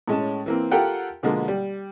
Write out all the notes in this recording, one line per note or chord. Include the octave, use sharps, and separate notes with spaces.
A2 G#3 C#4 A5
E3 A#3 C4
F4 G4 A4 A#4 F#5 G5
B2 D3 F3 G#3 A#3
G3